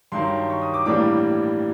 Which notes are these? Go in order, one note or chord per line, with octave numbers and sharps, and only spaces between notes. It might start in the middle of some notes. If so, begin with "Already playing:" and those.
G2 D#3 F#3 C6
C#6
D#6
D6
A2 E3 G3 A#3 D4 D6